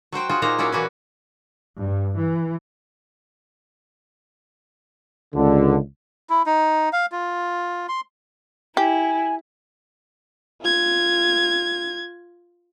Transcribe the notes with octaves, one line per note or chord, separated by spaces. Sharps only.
F#3 F#4 C5 G5
F4 F#4 G#4
A#2 A#3 D#4 F4 C5 A#5
F#3 C#4 E4 F#4 D5 F5
E3 F#4 B4 G#5
G2
E3
C#2 D3
E4
D#4
F5
F4
C6
E4 G4 G#5
F4 G#6